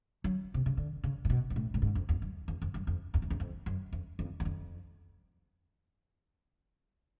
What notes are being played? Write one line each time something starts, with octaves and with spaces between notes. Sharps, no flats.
F#3
C3
C#3
D3
C#3
A#2
B2
A#2
A2
A2
G#2
F2
E2
F#2
E2
F2
F#2
F2
E2
F2
E2
F2
F#2
F2
F2
E2
F2